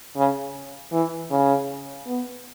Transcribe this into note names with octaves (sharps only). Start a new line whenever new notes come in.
C#3
E3
C#3
B3